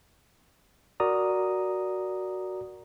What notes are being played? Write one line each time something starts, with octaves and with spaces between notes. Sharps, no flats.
F#4 A#4 D5 A#5 D#6